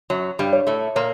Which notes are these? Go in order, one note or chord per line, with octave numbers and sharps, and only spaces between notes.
F#2 F#3 C#5
G2 G3
C#5
A2 A3
A#2 A#3 C#5